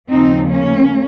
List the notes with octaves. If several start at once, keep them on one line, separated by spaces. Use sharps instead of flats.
D#2 C#3 F3 C4 D#4
A#3 C#4